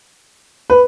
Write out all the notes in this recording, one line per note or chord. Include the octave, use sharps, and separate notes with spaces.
B4